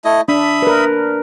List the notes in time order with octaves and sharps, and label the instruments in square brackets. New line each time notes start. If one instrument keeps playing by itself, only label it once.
[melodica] A3 E4 D#5
[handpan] D4 [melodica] E5 B5 D#6
[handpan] A#4 B4